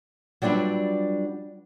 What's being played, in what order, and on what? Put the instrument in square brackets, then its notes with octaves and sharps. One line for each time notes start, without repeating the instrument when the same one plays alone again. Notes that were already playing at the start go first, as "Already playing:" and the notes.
[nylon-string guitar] F#3 G3 D4 F4 B4 E5